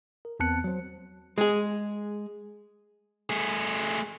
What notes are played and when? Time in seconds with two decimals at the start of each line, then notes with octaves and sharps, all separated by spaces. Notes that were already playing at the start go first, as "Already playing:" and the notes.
0.25 A#4
0.40 E2 B3 C4 A5 F#6 C#7
0.64 F#3 C5
1.38 G#3 G#4
3.30 A3 G#4